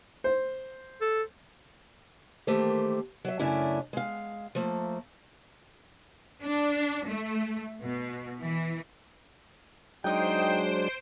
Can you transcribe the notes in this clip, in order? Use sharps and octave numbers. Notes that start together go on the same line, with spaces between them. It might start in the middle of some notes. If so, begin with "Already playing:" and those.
C5
A4
D#3 E3 A3 A#3 G4 C5
F#3 E5
F#2 C#3 A3 C#4 D4 E4
G#3 F5
F3 A3 A#3
D4
A3
B2
E3
F#3 G#3 D4 D#4 C5 D#5 G5 D7